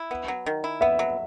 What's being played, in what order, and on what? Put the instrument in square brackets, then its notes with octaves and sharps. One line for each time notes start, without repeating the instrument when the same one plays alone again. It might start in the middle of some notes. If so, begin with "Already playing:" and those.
Already playing: [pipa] E4
B3
F#3
D#3
E4
[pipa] B3 [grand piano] E5
[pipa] F#3